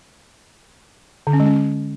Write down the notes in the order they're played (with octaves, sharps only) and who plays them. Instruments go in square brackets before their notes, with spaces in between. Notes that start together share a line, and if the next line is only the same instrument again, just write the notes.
[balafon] D3
C#4
G#3
C#4